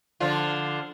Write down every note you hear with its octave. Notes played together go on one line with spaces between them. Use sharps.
D3 F3 F4